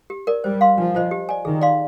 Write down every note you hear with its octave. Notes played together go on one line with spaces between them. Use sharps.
G4
A#4 D5
G3 C5
F5 C6
F3 D4
F4 C5 D#5
G4
D5 G#5
D#3 G#4
D5 F5 C6